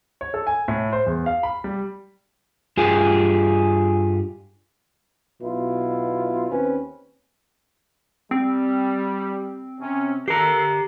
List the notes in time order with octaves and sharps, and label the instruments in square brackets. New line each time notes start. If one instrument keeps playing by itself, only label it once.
[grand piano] C#5
A4
G#5
A2
C5
E2
F5
B5
G3
[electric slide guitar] G2 F4 G4 G#4
[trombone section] B1 B2 E4 F4
D#2 C4 C#4 B4
[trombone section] G3 [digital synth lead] C4
[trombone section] C3 C#4
[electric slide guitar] G4 A#5 [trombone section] A4 A#4 [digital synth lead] C7